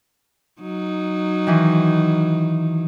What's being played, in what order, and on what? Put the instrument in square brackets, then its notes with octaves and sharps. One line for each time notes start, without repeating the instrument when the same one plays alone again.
[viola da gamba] F#3 D#4
[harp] D#3 E3